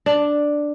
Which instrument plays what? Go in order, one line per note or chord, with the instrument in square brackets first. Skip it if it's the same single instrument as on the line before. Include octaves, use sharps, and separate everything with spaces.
[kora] D4